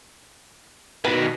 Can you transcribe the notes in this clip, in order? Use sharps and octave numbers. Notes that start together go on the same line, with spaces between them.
B2 D#3 B4